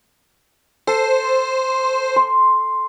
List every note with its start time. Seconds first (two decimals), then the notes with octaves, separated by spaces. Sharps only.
0.87 A4 C5
2.16 C6